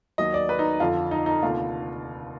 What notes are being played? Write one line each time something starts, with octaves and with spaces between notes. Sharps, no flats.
D#2 D#3 F#3 D#5
D5
B4
D#4
F2 D3 F3 F4
D#4
D#4
F1 D#2 D3 F4